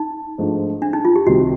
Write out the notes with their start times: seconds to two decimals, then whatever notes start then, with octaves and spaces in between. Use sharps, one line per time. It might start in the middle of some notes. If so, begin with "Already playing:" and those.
Already playing: D#4
0.38 G#2 F3 A3 D4
0.82 D4
0.93 D#4
1.05 F4
1.16 G4
1.27 C2 C3 D#3 F#4